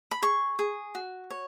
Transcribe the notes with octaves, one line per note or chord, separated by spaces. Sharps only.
B5
G#4 C#6
G#4
F#4
C#5